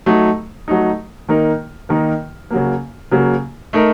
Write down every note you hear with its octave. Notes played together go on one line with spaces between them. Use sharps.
F#3 A3 D#4
F#3 A3 D#4
D#3 A#3 D#4 A#4
D#3 A#3 D#4 A#4
C#3 F#3 A#3
C#3 F#3 A#3
A3 D#4 A#4